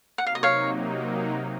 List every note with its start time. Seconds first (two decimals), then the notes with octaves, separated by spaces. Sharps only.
0.18 C3 F#3 A#3 D#4 F#5
0.27 F5
0.35 D#5
0.43 C#5 F5